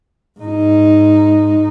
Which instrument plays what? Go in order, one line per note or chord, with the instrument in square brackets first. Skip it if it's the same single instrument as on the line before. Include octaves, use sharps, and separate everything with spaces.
[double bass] G#2 D#4